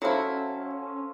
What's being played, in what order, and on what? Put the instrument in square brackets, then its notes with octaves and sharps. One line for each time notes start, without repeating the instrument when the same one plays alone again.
[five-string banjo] F#3 E4 [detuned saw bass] C#4 [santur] A4 C5 F5